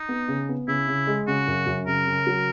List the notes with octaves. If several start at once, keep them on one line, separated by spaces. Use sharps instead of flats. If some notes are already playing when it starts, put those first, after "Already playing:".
Already playing: D#4
B3
C#3
B3
C#3 E4
C#3
G#3
C#3 F#4
F#2
F#2
C#3 A#4
C#3
F#3